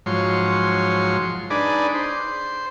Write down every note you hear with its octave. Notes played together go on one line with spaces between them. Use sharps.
G#2 F3 F#3 C#5 C6
D4 D#4 G#4 B4 D5
C5